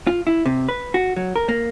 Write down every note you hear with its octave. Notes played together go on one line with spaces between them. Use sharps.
F4
E4
C3
B4
F#4
F#3
A#4
A#3